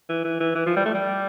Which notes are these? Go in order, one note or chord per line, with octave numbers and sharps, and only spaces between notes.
E3
E3
E3
E3
F3
G3
A3
G3